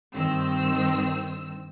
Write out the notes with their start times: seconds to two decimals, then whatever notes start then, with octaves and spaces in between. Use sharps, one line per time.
0.14 G2 D#3 C4 E6